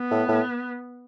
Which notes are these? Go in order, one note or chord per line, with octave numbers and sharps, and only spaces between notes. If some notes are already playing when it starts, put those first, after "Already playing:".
Already playing: B3
A2
A2